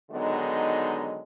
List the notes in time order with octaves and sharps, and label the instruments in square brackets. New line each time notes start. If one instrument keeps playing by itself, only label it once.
[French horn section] D3 D#3 F#3 G#3 B3 D#4